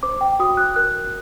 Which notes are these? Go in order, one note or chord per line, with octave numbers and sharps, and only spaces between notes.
C5 D6
G5
F#4 D#6
F#6
A#4 F#6